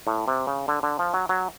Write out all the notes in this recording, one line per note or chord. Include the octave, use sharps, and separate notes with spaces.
A2
C3
C#3
D3
D3
F3
F#3
F#3